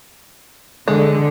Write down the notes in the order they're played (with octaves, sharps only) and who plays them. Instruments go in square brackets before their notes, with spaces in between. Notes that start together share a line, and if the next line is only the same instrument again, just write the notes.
[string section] D3 [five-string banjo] G#3